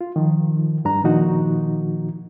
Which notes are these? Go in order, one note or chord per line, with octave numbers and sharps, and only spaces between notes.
F4
D#3 F3
G2 D4 A#5
A#2 D#3 F3 D#4 F#4